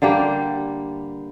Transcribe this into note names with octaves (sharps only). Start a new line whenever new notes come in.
D3 G3 A#3 G4